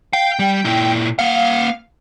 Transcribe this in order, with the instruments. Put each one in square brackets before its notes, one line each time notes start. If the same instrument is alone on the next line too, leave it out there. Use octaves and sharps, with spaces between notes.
[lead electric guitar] F5 [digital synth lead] G5
[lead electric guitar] G3
A#2 E4
[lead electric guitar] A#3 F#5 [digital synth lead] F5